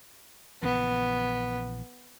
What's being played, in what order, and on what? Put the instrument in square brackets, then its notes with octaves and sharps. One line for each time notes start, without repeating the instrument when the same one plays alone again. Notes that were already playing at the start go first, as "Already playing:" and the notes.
[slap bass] A#1 C#3 E3 [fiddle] B3